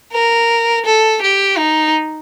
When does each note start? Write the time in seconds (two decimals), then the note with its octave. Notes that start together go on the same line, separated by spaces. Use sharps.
0.13 A#4
0.86 A4
1.22 G4
1.58 D#4